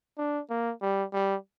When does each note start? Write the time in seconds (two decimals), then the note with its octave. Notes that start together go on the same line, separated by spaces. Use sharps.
0.18 D4
0.50 A#3
0.82 G3
1.13 G3